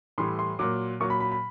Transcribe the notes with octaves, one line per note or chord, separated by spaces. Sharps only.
A2 E3 G3 C6
C6
A#2 F#3 D6
A#2 F#3 C#6
B5
B5
B5